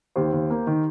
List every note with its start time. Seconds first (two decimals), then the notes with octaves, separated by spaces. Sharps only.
0.16 D#2 G4 C5
0.32 D#2
0.50 A#3
0.67 D#3